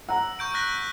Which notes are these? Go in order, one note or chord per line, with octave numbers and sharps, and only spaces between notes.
F#5 A#5 E6
C#6 G6 D7
F#6 A#6 B6